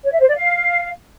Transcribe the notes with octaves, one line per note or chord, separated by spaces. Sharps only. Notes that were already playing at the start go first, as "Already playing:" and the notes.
C#5
E5
C5
D5
F5